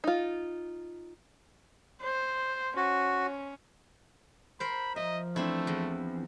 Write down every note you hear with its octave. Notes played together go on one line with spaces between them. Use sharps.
D#4 F4
C5
C#4 F#4
A#4 C5 B5
F3 D#5 E5
E3 A3 C4 D4 E4
E2